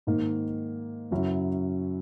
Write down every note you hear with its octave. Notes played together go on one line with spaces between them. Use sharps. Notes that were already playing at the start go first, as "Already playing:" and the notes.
G#2 D#3 A#3
F#2 C#3 F#3 C#4 E4